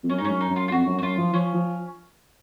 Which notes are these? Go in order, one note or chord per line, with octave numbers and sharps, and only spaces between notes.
F2
F#2 C#4
D#4
G#2 C#4
F#2
D#4
F#2
F4
F4
F2 F#4
F#2
F#4
F#2 F4
F3
F3 C#4
F3